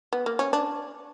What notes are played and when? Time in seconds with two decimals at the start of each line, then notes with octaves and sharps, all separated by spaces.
0.13 B3
0.26 A#3
0.39 C#4
0.53 D4